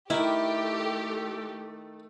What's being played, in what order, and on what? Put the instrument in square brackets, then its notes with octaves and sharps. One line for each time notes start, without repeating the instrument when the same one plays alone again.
[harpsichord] D#3 [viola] A3 A4 [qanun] E4 [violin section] G4